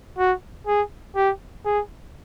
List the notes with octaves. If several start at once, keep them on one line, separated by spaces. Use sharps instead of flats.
F#4
G#4
G4
G#4